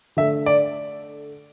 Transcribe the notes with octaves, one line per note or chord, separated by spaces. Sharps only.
D3 A3 E5
D5